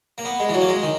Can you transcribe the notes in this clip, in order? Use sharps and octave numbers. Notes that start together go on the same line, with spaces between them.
A#3
B3
G#3
E3
F#3
A#3
G#3
D#3